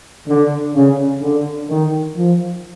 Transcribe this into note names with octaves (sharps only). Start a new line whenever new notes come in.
D3
C#3
D3
D#3
F3